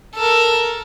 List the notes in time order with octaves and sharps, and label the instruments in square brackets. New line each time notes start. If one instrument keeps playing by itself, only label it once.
[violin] A4 A#4